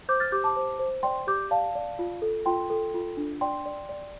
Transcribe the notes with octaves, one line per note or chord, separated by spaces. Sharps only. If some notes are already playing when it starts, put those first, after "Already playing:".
C5 D6 G6
F6 A6
G4 D6 G6
A5 D6
C5
C5
D5 G5 C6
G4 D6 G6
D5 F5 A5
D5
F4
A4
F4 G5 C6
A4
F4
D4
D5 G5 C6
D5
D5